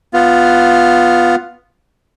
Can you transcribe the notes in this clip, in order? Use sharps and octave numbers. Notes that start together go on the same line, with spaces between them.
B3 F4